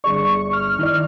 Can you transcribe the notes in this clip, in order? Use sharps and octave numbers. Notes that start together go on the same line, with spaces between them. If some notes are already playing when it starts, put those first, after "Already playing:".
G1 G#4 D5 C#6
F6
D#3 E4 D5